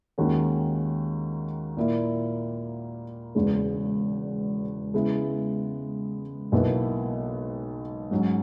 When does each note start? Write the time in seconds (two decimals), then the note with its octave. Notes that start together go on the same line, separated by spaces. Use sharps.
0.18 D#2 D#3 G#3 C#4 F#4
1.77 A#2 A#3 E4
3.35 E1 E2 C#3 G#3
4.94 C#3 G#3 B3 E4
6.52 B1 B2 A#3 E4 B4
8.11 G#2 F#3 C#4